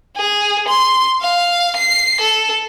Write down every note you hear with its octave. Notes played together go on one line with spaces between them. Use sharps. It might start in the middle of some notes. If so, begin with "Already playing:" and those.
G#4
C6
F5
C7
A4